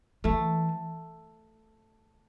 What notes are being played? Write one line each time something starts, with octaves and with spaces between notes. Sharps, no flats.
E3 A3